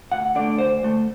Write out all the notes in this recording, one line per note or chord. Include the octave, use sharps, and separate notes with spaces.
D2 F#5
D3 A3 D5
D2 C5
D3 A3